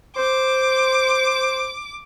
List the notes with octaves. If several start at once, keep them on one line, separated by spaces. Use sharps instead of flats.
C5 D6